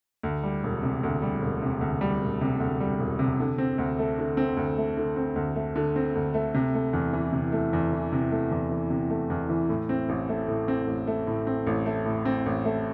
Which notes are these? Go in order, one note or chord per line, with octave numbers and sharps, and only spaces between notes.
D2
G3
E1
C3
D2
G3
E1
C3
D2
G3
E1
C3
D2
G3
E1
C3
D3
C4
D2
A3
D3
C4
D2
A3
D3
C4
D2
A3
D3
C4
D2
A3
C3
A3
E2
E3
C3
A3
E2
E3
C3
A3
E2
E3
C3
A3
E2
E3
A2
C4
A1
A3
A2
C4
A1
A3
A2
C4
A1
A3
A2
C4
A1
A3